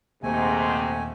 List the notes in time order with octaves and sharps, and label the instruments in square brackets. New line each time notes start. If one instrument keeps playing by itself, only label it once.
[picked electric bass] D#1 A#3 [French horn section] G#2 C3 [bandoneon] A3 G#5